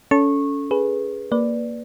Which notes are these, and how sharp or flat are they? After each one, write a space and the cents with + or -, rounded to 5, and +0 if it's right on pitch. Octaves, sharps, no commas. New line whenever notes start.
C#4 +25 A4 +0 C#6 -20
G#4 +0 B4 -10
A#3 +0 B4 +0 D5 +0